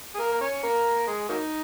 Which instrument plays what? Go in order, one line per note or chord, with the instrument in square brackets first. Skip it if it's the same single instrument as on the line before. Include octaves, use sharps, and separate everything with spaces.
[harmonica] G#4
A#3 A#4
A#4
C#4 C#5
A#3 A#4
G#3 G#4
F#3 A#3 D#4